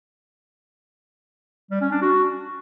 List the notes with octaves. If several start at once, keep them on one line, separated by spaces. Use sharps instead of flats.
G3
C#4
D4
F#4